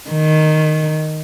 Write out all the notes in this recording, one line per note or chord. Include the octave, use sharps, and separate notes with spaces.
D#3